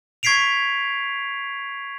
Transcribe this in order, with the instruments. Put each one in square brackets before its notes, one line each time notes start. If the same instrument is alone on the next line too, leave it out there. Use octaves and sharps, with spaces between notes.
[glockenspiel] C#6 G#6 B6 C7 D7 F7